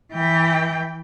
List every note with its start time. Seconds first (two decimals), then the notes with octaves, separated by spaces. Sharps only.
0.13 E3 G5